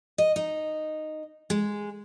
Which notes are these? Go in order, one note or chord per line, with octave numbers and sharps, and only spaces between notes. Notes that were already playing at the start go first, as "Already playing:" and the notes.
D#5
D#4
G#3